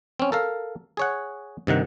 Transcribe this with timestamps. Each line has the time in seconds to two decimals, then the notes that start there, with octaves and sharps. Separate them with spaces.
0.20 C4 C#4
0.32 A4 A#4 F5
0.97 G#4 C#5 F#5
1.67 G2 C3 D#3 F#5